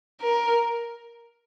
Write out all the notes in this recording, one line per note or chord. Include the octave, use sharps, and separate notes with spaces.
A#4